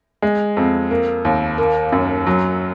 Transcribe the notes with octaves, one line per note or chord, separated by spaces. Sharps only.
G#3
F2
A#3
D#2
A#3
F#2
F#3